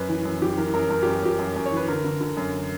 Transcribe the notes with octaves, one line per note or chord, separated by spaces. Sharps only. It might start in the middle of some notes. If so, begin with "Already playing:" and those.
Already playing: F#2 B4
E3
F#2
E3 G4
E3 A#4
F#2 A#4
F#2 A#4
F#2 G4
F#2 G4
F#2
F#2
C#5
E3 B4
D3 A#4
D3
D3
F#2